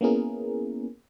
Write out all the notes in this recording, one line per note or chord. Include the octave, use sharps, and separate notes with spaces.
A#3 B3 C#4 E4 G#4 A#4